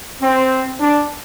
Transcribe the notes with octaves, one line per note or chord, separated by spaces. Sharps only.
C4
D4